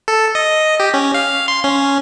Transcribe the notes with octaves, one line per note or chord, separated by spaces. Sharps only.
A4
D#5
G4
C#4
F5
C6
C#4